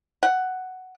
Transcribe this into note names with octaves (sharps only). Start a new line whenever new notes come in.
F#5